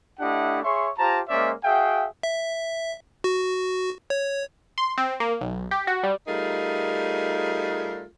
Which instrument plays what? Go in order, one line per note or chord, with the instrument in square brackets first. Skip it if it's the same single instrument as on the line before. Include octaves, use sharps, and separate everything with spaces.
[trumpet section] A3 D4 E4 G4 D#5 F#5
G#4 C#5 E5 C6 C#6
F4 G4 C5 A5 A#5
G#3 A#3 C#4 C5 D5 E5
F#4 G#4 E5 F5 G5
[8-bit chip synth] E5
F#4
C#5
[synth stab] C6
C4
A#3
B1
G4
F#4
G3
[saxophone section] G3 A3 D#4 F4 G#4 A#4